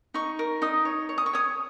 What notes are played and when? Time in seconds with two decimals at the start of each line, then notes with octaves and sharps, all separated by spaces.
0.14 D#4 C#6
0.39 A#4
0.62 D#4 D#6
0.85 C#5
1.09 C#5
1.18 D#6
1.26 C#6
1.33 C#5 D#6